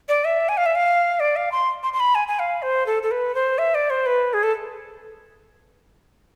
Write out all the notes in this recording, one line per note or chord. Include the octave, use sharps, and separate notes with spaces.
D5
E5
G#5
F5
E5
F5
D5
F5
C6
C6
C6
B5
G#5
G#5
F5
C5
A4
A4
B4
C5
E5
D5
C5
B4
G#4
A4